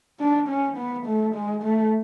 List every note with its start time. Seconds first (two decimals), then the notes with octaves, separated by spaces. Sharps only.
0.20 D4
0.49 C#4
0.77 B3
1.07 A3
1.35 G#3
1.63 A3